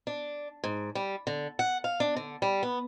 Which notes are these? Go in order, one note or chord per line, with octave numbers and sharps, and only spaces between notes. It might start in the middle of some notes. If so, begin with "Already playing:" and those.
D4
G#2
G3
D3
F#5
F5
D4
D3
G3
B3